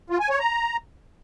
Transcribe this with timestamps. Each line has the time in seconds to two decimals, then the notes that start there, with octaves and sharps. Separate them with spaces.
0.10 F4
0.20 G#5
0.30 C#5
0.40 A#5